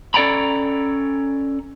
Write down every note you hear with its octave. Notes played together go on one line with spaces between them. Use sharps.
C#4 A4 D5 G5 A#5 B5